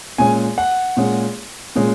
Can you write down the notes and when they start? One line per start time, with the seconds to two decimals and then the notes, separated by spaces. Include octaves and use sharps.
0.18 A#2 G#3 C#4 G#5
0.58 F#5
0.97 A#2 G#3 C#4
1.76 A#2 G#3 C#4